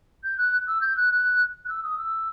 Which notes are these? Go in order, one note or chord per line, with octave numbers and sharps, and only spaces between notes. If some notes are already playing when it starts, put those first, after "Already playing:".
G6
F#6
E6
G6
F#6
F#6
F#6
E6
D#6
E6